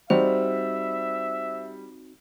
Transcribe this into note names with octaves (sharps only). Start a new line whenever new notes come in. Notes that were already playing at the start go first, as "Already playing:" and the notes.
G3 C4 D#4 F#4 C5 E5